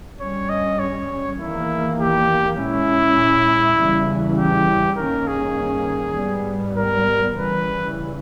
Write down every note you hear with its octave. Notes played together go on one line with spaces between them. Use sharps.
G2 G3 C#4 C#5
D#5
C#5
E2 D#3 A#3 E4
G4
A#2 G#3 C#4 E4
E2 C#3 E3 G3
G4
G2 D#3 A#3 C#4 A#4
G#4
G#2 G3 B3
A#4
C#3 E3 G3 B4